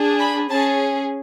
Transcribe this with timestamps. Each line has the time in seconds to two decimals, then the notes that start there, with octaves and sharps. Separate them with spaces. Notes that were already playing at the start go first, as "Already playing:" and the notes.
Already playing: D4 G#4
0.19 B5
0.49 C#4 G#4 A5